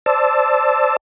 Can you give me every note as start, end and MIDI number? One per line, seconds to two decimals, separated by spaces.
0.06 0.97 72
0.06 0.97 74
0.06 0.97 81
0.06 0.97 88